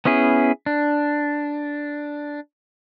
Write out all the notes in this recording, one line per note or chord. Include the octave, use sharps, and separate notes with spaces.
B3 C#4 E4 G#4
D4